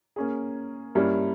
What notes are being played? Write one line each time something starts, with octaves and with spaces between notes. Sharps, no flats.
A#3 C#4 G#4
G2 G3 A#3 C#4 E4